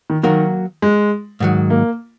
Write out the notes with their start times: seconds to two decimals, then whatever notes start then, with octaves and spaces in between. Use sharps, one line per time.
0.10 D#3
0.23 D#3 F#3 A#3 F#4 A#4
0.82 G#3
1.40 G#2 D#3 F#3
1.70 A#3